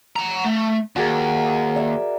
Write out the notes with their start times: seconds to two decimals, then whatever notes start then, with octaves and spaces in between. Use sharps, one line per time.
0.16 F#5 A#5
0.44 A3
0.96 D#2 F#4 G#4 A#4
1.76 D5 E5